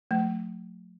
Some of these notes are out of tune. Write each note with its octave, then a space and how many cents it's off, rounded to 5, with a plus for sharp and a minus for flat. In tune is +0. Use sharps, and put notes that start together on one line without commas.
F#3 -40 A3 +10